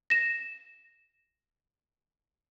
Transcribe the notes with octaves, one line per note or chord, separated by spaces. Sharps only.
A#6 E7